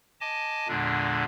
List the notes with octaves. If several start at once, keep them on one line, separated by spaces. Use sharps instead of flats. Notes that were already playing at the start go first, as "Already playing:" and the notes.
D#5 G#5 A5 D6
E2 A#2 D3 G#3 D4